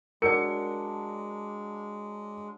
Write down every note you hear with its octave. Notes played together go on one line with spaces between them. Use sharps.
F#3 G#3 D4 A#4 D5 C#7